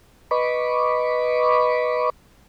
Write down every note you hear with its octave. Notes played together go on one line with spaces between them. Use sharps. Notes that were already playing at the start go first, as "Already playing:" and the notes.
B4 D#5 B5 C#6 D6